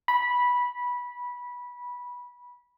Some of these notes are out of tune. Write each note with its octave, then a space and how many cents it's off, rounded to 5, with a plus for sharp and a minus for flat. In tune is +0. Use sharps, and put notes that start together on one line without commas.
B5 -15